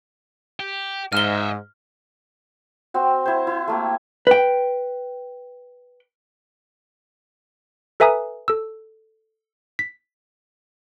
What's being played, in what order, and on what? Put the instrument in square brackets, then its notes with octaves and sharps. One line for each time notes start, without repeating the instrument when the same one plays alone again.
[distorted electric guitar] G4
[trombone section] G#2 [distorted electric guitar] D#5 E5 [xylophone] F6 G7
[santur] C4 F#4
E4 C5
E4
A3 A#3 G4
[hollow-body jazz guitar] B4 G5
[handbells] A4 B4 E5 G#5 A#5 D#6
A4 E6
B6